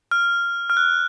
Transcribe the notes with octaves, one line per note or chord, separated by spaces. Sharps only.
F6
F6
F#6